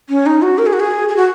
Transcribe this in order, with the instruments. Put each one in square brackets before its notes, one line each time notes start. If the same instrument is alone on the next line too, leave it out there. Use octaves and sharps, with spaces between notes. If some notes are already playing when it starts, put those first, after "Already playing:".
[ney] C#4
D#4
F#4
A#4
G#4
F#4
G#4
G#4
F#4